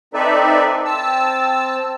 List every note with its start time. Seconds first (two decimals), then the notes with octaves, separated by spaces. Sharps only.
0.14 C4 D#4 A4 B4 D5 E5
0.85 C4 A5 E6